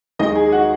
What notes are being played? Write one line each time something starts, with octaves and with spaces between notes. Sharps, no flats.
D#2 D#3 G#3 D#5
G#4 G#5
F#4 F#5